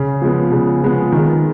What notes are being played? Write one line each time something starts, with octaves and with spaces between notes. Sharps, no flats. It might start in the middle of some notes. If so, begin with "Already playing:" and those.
Already playing: C#3
F3 G#3 B3
C#3
F3 G#3 B3
D#3